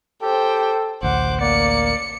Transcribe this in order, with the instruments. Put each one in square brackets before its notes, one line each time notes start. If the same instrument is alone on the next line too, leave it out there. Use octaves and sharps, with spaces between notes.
[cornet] G4 [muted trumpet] A4 [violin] C5 G5
[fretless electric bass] A1 D2 [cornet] C5 [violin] F#5 D6
[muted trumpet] A#3 [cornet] D5 [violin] C#7